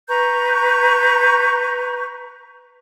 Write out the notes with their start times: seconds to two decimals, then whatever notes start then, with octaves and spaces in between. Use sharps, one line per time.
0.08 B4 A#5 C#6 G6